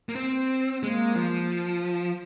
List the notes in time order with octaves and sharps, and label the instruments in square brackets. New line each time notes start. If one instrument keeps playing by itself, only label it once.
[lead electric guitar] A#3
C4
[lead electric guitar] G#3 [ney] A#3
[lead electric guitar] F3